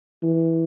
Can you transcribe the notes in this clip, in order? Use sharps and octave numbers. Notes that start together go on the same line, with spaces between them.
E3